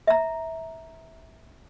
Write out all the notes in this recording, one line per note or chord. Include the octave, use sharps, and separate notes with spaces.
E5 A#5